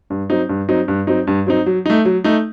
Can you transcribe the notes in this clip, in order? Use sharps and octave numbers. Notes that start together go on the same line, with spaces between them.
G2
F#3 C4 D#4
G2
F#3 C4 D#4
G2
F#3 C4 D#4
G2
F#3 C4 D#4
F#3
A3 D#4
F#3
A3 D#4